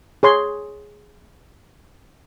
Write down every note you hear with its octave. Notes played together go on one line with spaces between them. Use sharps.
G#4 C#5 C6